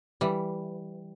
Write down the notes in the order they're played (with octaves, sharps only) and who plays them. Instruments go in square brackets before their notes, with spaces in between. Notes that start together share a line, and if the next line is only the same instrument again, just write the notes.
[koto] E3 G3